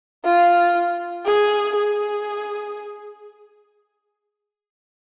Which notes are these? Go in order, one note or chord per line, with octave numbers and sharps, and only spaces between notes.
F4
G#4
G#4